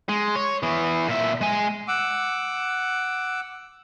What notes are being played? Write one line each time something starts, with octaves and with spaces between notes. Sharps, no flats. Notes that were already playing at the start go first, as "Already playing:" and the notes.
G#3
C#5
E3 B3
A#2 E5
G#3 G#5
F#5 D6 E6